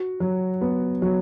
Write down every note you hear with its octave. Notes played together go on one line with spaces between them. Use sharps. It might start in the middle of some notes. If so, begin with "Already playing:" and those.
Already playing: F#4
F#3
B3
F#3